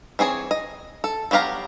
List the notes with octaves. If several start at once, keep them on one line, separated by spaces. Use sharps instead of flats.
E3 C4 G#4 C#5
D#5
A4
F#3 B3 G4 F5 A#5